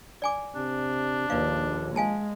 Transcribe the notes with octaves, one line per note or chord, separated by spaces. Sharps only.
D5 G#5 D6
C3 D4
A#1 D#2 B4 D5 F5
G#3 F5 G#5 A5